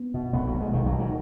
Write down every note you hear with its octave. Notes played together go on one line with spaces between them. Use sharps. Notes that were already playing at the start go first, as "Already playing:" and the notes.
Already playing: B3
B2
B1 B3
F#3
B2
G#3
B1 D#3
F#3
B2
D#3